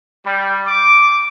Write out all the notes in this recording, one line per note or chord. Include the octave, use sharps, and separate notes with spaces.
G3
D6